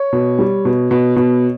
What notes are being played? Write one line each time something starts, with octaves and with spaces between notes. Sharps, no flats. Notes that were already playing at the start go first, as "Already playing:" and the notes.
Already playing: C#5
B2
G3
B2
B2
B2